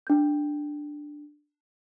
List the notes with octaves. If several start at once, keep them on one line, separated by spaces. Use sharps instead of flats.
D4 G6